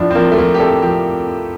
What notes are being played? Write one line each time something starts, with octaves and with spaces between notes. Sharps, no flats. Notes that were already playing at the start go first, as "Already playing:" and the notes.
Already playing: A2 F3 D4
C4
F3 A#3
A3
F3 A#3
G4
A2 A4
F3 G4